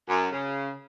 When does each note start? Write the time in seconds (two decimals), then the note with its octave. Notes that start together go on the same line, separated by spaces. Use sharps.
0.08 F#2
0.32 C#3